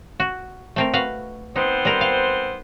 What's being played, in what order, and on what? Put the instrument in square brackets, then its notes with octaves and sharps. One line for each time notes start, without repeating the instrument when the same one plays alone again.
[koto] F#4
A3 C4 A#4
F#4 B4 F5
[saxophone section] B3 C4 C5 [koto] D#4
[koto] G3 A#4
F5